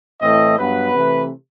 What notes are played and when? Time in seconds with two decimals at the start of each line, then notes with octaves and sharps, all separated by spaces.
0.21 A2 E3 A3 C4 D#5
0.58 G2 F#3 B3 B4
0.94 C3 E3 A3